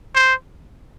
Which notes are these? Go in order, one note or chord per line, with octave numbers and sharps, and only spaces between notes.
C5